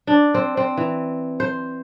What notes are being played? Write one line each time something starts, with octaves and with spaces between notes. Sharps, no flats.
D4
C4
C4
E3
C5